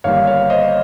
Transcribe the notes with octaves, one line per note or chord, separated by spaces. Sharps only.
G1 G2 D#3 G3 A#3 C#5 F5
C#5 F5
C5 D#5